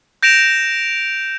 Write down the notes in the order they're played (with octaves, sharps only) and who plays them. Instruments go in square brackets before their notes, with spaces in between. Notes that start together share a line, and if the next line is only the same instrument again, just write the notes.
[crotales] G6 A#6 D7 E7 F7